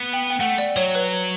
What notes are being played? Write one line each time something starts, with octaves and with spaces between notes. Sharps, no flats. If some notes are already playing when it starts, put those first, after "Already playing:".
Already playing: B3
G5
G5
A3 F#5
D5
F#3 C#5
B4